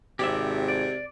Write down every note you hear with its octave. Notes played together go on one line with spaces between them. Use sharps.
G#1 C3 G4 D5 E5
D5